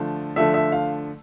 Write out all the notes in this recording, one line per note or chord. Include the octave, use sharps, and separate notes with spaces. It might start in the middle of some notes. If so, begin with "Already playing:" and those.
Already playing: D3 F3 A3
D3 F3 A3 E5
E5
F5